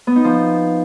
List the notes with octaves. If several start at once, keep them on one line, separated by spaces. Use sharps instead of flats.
B3
D#4
F3